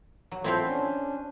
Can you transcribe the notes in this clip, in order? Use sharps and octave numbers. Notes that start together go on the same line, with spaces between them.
F#3
C4 E4 F4 A4 C5
C#4 D4